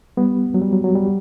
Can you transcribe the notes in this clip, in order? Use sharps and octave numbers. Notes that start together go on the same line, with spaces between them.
G3 B3
F#3
G3
F#3
F#3
G3